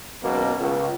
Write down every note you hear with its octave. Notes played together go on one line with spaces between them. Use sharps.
G#1 F#2 B2 A#3
C#2